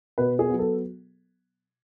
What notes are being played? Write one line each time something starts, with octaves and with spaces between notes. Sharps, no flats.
B2 B4
G#4
F#3 B3
A4